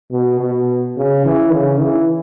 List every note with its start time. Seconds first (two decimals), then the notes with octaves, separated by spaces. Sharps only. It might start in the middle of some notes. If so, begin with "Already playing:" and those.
0.11 B2
0.40 B2
0.97 C#3
1.25 E3
1.53 C#3
1.81 E3